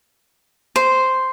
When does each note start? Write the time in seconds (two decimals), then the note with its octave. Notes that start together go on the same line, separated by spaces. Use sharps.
0.76 C5